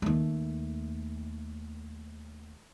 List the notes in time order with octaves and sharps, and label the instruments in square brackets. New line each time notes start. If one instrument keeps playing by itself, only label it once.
[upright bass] D#2 A3